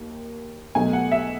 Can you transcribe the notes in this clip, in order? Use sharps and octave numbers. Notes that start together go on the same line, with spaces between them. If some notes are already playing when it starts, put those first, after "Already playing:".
Already playing: D#2
B1 B2 A3 G#5
F#5
E5